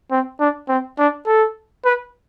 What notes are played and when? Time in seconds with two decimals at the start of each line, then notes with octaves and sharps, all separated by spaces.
0.11 C4
0.40 D4
0.69 C4
0.99 D4
1.26 A4
1.85 B4